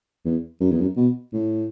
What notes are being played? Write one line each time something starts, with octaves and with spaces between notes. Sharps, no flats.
E2
F#2
E2
F#2
B2
A2